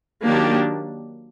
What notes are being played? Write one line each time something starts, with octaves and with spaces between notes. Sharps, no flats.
D#3 F#3 A#3 D4 G4